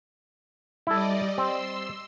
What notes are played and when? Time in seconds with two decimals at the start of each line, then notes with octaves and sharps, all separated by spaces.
0.87 G3 E4 A4 D5 D#5
1.38 C4 C6 E6